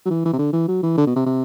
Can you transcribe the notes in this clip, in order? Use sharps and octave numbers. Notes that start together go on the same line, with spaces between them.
F#3
E3
E3
C3
D3
E3
F#3
E3
D3
B2
C3
C3